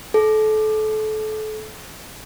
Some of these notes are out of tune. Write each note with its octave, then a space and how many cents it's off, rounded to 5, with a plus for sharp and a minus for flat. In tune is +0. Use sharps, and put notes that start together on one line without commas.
A4 -30